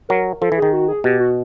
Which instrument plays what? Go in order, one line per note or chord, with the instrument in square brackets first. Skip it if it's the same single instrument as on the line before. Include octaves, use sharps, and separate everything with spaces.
[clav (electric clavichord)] F#3 [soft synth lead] A#4
[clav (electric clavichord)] F3 [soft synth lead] A4
[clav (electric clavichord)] E3
[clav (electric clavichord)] D#3 [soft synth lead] G#4
[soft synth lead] F#4
G#4
[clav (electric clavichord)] B2 [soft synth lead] G4
[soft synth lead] F#4